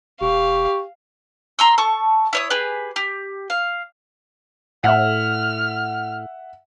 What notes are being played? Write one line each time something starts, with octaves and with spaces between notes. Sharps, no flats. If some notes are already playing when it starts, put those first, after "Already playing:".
E1 G4 F5 C#6
A#5 C6 E6
A4 A5 C#6
E4 C#5 D#6
G4 G#4 B4
G4
F5
A2 E5 F#5 F6